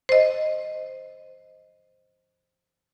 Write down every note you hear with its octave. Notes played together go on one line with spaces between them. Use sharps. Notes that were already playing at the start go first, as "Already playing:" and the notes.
C5 D#5